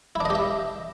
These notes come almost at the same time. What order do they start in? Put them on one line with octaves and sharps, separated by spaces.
E4 D4 D#5 G4 E5